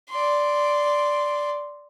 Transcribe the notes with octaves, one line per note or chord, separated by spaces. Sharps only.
D5 C6